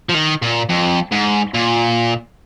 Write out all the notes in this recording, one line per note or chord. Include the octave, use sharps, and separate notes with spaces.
F3
D#3
A#2
F2
G#2
A#2